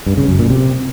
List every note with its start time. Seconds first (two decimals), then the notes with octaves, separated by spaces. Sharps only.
0.06 G2
0.17 C#3
0.28 F#2
0.39 A#2
0.50 C3